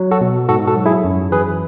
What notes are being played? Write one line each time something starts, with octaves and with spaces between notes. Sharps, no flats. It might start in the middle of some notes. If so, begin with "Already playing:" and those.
Already playing: F#3
F#4 A4
B2
G#2 F#4 A4
F#4 A4
F#3
E4 G#4
F#2
E3 G#4 B4